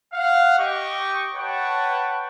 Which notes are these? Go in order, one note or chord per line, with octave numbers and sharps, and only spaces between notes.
F5 F#5
G4 D#5 C#6
B4 C#5 F#5 G5 A5 C#6